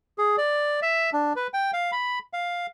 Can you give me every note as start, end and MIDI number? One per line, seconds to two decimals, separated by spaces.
0.18 0.36 68
0.38 0.80 74
0.82 1.10 76
1.13 1.33 62
1.36 1.47 71
1.54 1.71 79
1.73 1.91 77
1.92 2.19 83
2.33 2.66 77